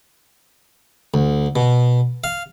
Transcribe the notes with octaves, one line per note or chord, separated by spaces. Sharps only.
D2
B2
F5